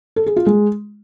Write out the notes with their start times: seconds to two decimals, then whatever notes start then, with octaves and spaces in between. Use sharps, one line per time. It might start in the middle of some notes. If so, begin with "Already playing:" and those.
0.16 A4
0.26 G#4
0.36 F4
0.46 G#3